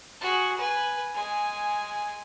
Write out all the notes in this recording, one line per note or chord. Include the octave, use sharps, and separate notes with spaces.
F#4 G#4
B4 G#5
G#3 G#5